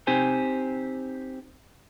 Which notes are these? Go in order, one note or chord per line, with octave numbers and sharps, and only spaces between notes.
C4 D#4 G4 C5 G#5